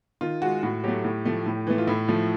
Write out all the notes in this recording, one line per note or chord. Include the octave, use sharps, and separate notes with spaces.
D#3 F4
G#3 F#4
A2 F#4
F#3 A3 G4
A2
F3 A3
A2
E3 A3
F4
A2 E4
F3 A3